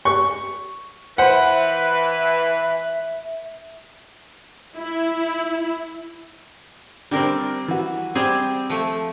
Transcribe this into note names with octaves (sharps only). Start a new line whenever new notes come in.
C#6
E3 B4 C5 E5 F#5
E4
D3 G3 C4 A#4
E3 F#4
G3 C4 G#4
F3 A3